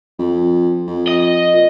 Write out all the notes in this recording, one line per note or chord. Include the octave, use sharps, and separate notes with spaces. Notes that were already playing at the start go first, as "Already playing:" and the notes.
F2
F2
D#5
A#2